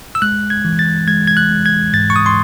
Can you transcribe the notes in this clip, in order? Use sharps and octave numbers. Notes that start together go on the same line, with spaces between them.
E6
G#3 F#6
G#6
E3
A6
G#3 G#6
G#6
F#6
G#3
G#6
G#2 A6
C#6
D#6
C6